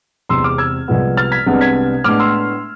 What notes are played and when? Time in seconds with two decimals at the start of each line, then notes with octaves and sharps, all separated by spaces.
0.29 E2 C3 E3 G#3 C4 C6 E6
0.44 D6 F6
0.58 E6 G#6
0.88 C2 C3 F3 G#3 B3
1.17 F6 A6
1.32 G#6 B6
1.46 C2 C3 G#3 B3 D4
1.61 G#6 B6
2.04 A2 G#3 B3 D4 D6 F6
2.19 C6 E6